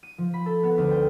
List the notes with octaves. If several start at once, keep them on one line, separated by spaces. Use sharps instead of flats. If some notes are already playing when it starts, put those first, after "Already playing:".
D#7
F3
B5
A4
B3
D2
G5